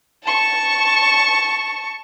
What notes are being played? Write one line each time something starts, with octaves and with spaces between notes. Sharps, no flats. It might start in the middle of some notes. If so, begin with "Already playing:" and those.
A5 C#6